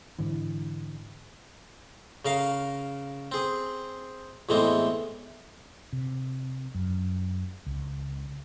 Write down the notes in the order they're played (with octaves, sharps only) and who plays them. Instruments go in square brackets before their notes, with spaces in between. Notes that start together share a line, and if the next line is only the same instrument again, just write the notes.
[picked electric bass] G#2 D3 E3
[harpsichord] C#3 A#4 F5
C4 G#4
E2 A2 E3 G#3 C4
[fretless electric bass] C3
F#2
C#2